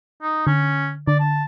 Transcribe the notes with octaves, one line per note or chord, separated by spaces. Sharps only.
D#4
D3 C#4
D3 D5
A5